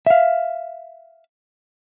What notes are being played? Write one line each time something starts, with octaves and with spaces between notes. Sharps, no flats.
E5 F5